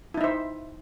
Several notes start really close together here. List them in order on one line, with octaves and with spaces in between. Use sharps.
E4 D#4 E5 C5